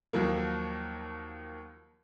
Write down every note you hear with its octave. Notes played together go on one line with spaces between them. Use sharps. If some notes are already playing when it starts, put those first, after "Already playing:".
D#2 F3 F#3 A#3